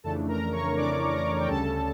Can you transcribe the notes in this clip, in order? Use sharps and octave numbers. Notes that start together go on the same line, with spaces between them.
F2 C#3 E3 A3 D4 A4 A5
A#4 A#5
C#5 C#6
F2 C#3 E3 A3 D4 D5 D6
A#4 A#5
G5
D2 C#3 G3 C#4 A4 A5